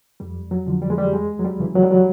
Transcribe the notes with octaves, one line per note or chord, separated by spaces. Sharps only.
F2 G3
F#3
D3 F3
G3
G#3
G3
E2 G#3
F#3
G3
C#3 E3
F#3
G3
F#3